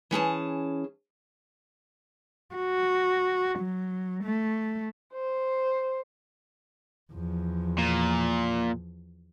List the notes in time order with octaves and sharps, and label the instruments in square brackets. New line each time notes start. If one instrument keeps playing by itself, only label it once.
[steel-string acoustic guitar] E3 C#4 G#4 A5
[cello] F#4
F#3
A3
[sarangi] C5
[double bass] E2 F3
[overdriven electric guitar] A#2